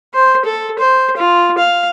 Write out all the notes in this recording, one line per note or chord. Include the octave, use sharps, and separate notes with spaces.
C5
A4
C5
F4
F5